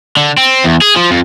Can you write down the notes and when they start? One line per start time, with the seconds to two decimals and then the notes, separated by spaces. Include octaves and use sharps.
0.17 D3
0.38 C4
0.64 E2
0.82 G#4
0.96 F3
1.11 F2